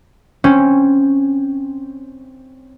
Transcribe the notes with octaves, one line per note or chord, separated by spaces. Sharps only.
C4 C#4